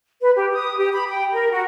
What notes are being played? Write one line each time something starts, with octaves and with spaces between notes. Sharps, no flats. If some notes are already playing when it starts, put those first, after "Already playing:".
B4
G4
D#6
G4
B5
G5
A#4
F#4